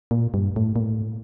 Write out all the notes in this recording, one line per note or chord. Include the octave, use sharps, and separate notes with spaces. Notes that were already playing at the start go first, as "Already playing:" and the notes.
A#2
G2
A2
A#2
A2